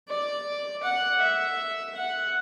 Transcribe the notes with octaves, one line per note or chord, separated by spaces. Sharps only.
D5
F#5
E5
F#5